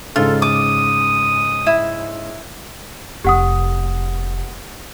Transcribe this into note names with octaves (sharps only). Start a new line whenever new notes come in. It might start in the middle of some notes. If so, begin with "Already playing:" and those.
G#2 C#3 F4 A4
D6 D#6
E4
F1 G4 F#5 D#6